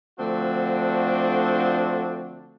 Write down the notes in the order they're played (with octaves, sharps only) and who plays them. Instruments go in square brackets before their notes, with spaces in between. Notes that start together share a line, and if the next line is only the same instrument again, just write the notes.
[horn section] D3 F3 A3 C4 D4 F#4